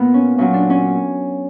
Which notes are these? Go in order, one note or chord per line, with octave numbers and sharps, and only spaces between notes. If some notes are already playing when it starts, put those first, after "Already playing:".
Already playing: A#2 A#3 B3
C#4
A#2 F#3 A#3 C#4
D4
C#4